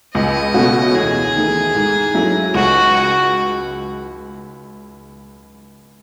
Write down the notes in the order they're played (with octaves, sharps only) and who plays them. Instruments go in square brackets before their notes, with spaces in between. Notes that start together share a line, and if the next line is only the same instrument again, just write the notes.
[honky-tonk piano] C#2 [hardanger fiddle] D#5
[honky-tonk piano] B2 A3 C#4 F#4
[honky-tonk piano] E2 [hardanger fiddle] G#4
[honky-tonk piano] D#3 A3
G#2
F#3 A3 C#4 E4
[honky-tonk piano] C#2 [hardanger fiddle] F#4